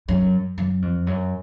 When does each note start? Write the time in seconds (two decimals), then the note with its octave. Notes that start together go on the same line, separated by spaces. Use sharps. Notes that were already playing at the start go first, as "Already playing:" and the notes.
0.08 F#2
0.58 F#2
0.82 F2
1.07 F#2